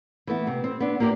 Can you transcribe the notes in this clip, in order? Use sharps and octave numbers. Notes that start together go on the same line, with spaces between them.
E3 A3 B3 E4
C3
C4
B3 D4
A#3 F4 G4 C#5 D5